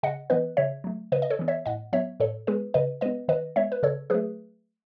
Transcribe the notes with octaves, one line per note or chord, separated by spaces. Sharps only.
C#3 D#5 F#5
E3 B3 B4 D#5
C#3 C#5 E5
F#3 A3
C#3 B4 D#5
D#5
A4 C#5
E3 B3
C#5 E5
A2 D#5 F#5
F#3 B3 C#5 E5
A2 A4 C#5
G#3 B3 G#4 B4
C#3 B4 D#5
G#3 B3 B4 D#5
D#3 B4 D#5
G#3 B3 C#5 E5
B4
C#3 A4 C#5
F#3 A3 G#4 B4